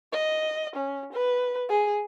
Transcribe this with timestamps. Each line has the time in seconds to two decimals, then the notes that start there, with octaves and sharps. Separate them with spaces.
0.12 D#5
0.75 C#4
1.12 B4
1.69 G#4